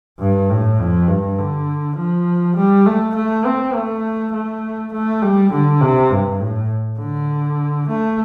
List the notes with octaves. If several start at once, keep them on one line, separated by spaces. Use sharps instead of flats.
G2
A2
F2
G2
D3
F3
G3
A3
A3
C4
A3
A3
A3
G3
D3
C3
G2
A2
D3
A3